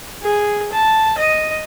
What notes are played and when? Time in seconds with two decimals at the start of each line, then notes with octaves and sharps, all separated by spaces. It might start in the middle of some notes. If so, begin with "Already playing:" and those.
0.22 G#4
0.73 A5
1.18 D#5